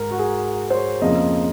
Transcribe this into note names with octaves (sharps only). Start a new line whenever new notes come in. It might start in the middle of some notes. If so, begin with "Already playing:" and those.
Already playing: G#2 A#4
F#4
G#4
C5
C#5
F2 C#3 F3 A#3 D#5